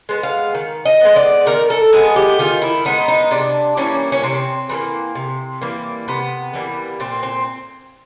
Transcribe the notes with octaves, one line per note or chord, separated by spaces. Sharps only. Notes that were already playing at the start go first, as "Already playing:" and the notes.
G#3 B3
F5
D#3
D#5
G#3 B3
D5
D#3 A#4
A4
G#3 B3 G#4
G4
D#3 F4
E4
G#3 B3 D#4
D#4
C3 D4
E3 G3 A#3 C#4
C#4
C3 C4
E3 G3 A#3
C3
E3 G3 A#3
C3 B3
E3 G3 A#3
A#2 C4
C4